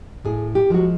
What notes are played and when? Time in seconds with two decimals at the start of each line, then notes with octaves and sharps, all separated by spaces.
0.25 A2 G#4
0.55 G4
0.70 F3 G#3 F#4